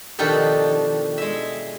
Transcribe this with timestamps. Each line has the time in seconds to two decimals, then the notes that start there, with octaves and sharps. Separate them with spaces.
0.19 B2 D#3 F3 D4 G4 A4
1.18 G#3 E5